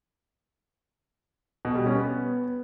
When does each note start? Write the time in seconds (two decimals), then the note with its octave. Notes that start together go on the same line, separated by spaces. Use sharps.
1.65 B2
1.75 G3
1.86 C#4
1.97 B3